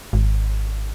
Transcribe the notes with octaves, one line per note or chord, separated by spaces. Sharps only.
G#1